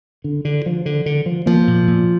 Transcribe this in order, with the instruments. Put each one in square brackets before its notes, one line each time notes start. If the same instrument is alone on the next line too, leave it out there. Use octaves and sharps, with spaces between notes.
[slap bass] D3
D3
F3
D3
D3
F3
[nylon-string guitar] F3 [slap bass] A#3
[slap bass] A#2
A#2